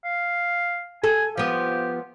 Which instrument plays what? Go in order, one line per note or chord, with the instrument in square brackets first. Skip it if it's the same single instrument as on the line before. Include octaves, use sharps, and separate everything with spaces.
[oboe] F5
[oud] A4 [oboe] G#5
[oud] F3 B3 [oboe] G4